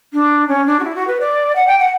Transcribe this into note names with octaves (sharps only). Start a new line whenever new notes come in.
D4
C#4
D4
F#4
E4
F#4
B4
D5
F#5
G5
F#5